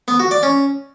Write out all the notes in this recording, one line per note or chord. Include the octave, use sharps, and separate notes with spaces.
B3
F#4
D5
C#4